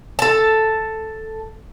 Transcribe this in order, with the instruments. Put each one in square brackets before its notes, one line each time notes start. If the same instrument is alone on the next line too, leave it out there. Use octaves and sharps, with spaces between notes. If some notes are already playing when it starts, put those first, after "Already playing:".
[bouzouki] A4 A5